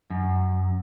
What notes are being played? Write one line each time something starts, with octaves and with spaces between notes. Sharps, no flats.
F#2